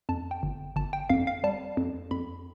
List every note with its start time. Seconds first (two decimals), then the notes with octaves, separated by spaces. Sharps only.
0.09 F2 A5
0.31 G5
0.43 G1
0.76 G1 A5
0.93 G5
1.09 F2 F5
1.27 F5
1.44 G3 A5
1.77 F2
2.11 F2 B5